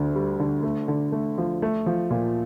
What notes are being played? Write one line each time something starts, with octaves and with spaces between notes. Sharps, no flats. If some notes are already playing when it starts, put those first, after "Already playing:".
Already playing: D2 D3
G3
D3
A3
D3
A3
F3
A3
F3
A#2